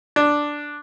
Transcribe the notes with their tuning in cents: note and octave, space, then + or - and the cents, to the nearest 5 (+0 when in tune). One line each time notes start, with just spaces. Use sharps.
D4 +0